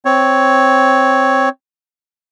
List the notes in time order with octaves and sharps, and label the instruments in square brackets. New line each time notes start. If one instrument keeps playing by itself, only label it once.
[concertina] C4 C#5